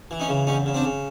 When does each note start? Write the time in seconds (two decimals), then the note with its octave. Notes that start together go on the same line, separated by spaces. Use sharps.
0.11 E3
0.20 C#4 D#4
0.29 C#3
0.47 E2 C#4 D#4
0.66 C#3
0.74 C4 D4
0.85 C#3